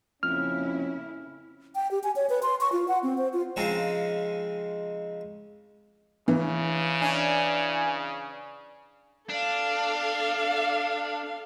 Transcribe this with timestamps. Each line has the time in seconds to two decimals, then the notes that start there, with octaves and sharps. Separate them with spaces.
0.23 F2 C#3 A#3 C#4 E4 F6
1.75 G5
1.91 G4
2.04 G#5
2.16 C#5
2.30 B4
2.43 C6
2.61 C#6
2.72 F4
2.88 F#5
3.03 C4
3.18 C5
3.33 F4
3.56 C#3 F3 G#3 C4 C#4 D#4
6.28 C#3 E3
7.01 C#4 D4 G#5
9.29 D4 A4 F5